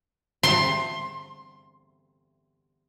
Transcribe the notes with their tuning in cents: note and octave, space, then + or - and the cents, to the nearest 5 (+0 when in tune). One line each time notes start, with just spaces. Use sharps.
C6 +15